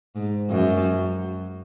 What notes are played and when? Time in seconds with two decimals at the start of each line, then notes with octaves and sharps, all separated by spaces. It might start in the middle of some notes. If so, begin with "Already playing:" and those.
0.16 G#2
0.50 F#2